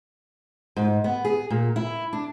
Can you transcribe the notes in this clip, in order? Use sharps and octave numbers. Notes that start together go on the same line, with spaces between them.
G#2
B3
G#4
A#2
E4
D4